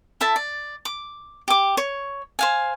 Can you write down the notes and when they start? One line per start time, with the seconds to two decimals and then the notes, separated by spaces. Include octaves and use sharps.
0.21 E4 A4 E5 A5
0.36 D5
0.85 D6
1.48 G4 D6
1.77 C#5
2.39 C5 F5 G#5